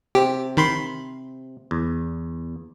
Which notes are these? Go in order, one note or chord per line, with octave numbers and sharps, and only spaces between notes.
C3 C4 G4
D#3 B5 C6
E2